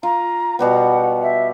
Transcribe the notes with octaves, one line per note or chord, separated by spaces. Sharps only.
F4 A#5
B2 G3 B3 F#5
E5